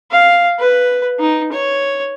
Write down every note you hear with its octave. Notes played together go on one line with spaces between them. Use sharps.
F5
B4
D#4
C#5